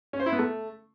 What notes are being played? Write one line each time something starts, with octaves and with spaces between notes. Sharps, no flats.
C#4
C5
E4
B3
A3